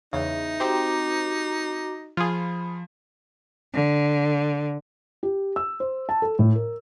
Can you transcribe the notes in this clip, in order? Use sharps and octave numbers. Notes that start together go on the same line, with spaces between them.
E2 C#3 D#4 E5
C4 F#4 G4 C5 A#5 D6
F3 F4 G#4 B5
D3
G4
E6
C5
A5
A4
A2
A#4